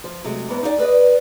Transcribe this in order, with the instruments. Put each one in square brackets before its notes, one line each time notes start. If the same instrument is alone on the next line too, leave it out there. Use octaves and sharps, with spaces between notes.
[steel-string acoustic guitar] F3
C3 F#3 G#3 A3
E2 G#2 E3 B3
D#4 E4 D5 G#5
G#4 B4 D5 D#5